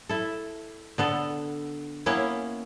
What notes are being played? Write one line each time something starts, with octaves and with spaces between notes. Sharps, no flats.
E4 A4
D3 B3 A4
A#3 B3 C#4 E4